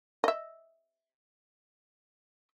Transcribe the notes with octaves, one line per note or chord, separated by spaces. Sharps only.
D#5 E5